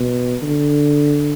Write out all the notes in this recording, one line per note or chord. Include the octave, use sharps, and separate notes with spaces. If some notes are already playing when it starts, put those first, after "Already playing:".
Already playing: B2
D3